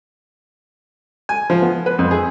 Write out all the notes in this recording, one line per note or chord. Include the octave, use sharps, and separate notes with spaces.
G#5
F3
B3
B4
F2
G#4